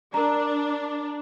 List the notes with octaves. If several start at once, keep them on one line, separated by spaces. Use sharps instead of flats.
D4 A#4 A#5